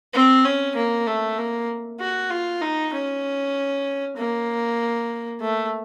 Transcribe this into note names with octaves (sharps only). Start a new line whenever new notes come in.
C4
C#4
A#3
A3
A#3
F#4
F4
D#4
C#4
A#3
A3